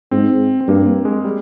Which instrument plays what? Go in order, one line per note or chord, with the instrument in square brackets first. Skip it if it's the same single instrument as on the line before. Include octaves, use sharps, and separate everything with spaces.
[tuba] G#2 [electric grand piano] C4
[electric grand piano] C4
[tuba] G2 [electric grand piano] A#3
[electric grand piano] A#3
G#3
G3